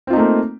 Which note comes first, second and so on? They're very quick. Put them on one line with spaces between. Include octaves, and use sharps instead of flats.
C4 F4 D#4 A3 A#3